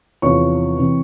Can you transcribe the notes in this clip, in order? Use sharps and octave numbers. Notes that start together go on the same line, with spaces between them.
E2 C3 F3 C#5 C#6
C3 E3